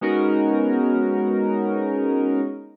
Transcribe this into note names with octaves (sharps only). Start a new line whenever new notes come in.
G#3 B3 C#4 D#4 F#4 A#4